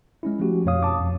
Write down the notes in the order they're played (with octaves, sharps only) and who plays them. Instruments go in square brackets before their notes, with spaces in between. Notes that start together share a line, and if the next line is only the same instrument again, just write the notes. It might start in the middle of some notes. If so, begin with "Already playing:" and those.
[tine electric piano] G#3 C#4 E4
F3 A3 C#4 F#4 G4
F2 B2 C#5 F5 D#6
A5 D6
F2